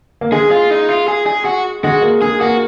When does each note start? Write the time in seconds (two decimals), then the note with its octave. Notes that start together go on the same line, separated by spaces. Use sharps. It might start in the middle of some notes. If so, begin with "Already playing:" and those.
0.21 A#3
0.32 G#3 G#4
0.51 F4
0.71 D#4
0.89 F4
1.08 G#4
1.26 G#4
1.45 F#4
1.84 G#3 F#4
2.02 A#3
2.22 G#3 G#4
2.41 A#3 F#4